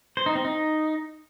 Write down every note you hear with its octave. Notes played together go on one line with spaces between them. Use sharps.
C5
D#4
C4
D#4